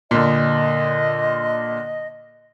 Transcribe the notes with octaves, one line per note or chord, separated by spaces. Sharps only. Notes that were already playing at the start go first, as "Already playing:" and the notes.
A#2 D3 D#5